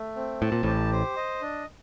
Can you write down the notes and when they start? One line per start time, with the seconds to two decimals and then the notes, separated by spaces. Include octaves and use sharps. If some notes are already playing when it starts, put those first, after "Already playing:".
Already playing: A3
0.16 C4
0.42 A2 A5
0.52 A#2
0.63 A1 A2 G4
0.92 C5
1.16 D#5
1.42 D4